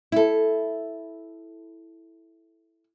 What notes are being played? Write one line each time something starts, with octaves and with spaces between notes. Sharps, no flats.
E4 A4